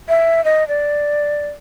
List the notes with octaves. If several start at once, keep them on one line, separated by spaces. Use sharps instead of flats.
E5
D#5
D5